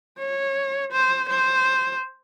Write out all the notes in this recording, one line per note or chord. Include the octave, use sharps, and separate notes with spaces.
C#5
C5
C5